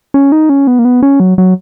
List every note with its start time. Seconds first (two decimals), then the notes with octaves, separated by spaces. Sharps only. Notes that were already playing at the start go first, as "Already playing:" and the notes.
0.14 C#4
0.32 D#4
0.49 C#4
0.67 B3
0.79 A#3
0.85 B3
1.03 C#4
1.20 F#3
1.38 F#3